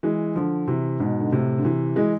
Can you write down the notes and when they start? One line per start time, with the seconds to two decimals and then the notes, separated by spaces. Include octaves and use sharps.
0.03 E3 G#3
0.35 D3 F3
0.68 C3 E3
1.00 G#2 B2
1.20 D3
1.32 A2 C3
1.58 D3
1.65 C3 E3
1.96 E3 G#3